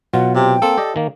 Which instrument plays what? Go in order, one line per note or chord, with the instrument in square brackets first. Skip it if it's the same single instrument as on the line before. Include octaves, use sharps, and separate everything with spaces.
[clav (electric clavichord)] B2 F#3 F4 [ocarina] F#5
[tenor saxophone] C3 [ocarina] G5
[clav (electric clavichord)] A#3 C4 [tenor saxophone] A4
[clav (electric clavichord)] G4 D5 D#5
D#3 A#3